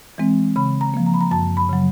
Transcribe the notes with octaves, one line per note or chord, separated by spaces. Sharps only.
E3 G#3 C4
C#3 B5
A#5
F3 A#3
A#5
B5
A#5
F#2 A5
B5
C#3 F#3